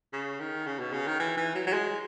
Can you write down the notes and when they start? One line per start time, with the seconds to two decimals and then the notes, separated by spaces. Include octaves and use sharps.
0.13 C#3
0.40 D#3
0.67 C#3
0.80 B2
0.93 C#3
1.07 D#3
1.20 E3
1.37 E3
1.55 F#3
1.67 F#3
1.73 G#3